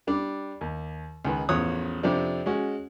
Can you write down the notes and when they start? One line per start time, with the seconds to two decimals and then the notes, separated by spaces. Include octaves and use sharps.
0.07 G3 D4
0.61 D#2
1.25 C#2 D#3 B4
1.49 A1 E2 F3 C#5 D#6 F#6
2.03 F2 C3 F3 D4 D5
2.46 G#3 C#4 F#4